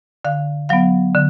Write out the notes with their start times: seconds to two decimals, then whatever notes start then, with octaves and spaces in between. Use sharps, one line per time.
0.25 D3 F5
0.69 F#3 B3 F5
1.15 D3